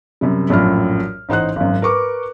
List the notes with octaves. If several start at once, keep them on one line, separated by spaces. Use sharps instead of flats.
F#2 C3 G3
A#1 F#2 A2 F4 D5 F6
A1 D#4 C5 F#5 F#6
G#1 F#2
A#4 B4 C#6 D6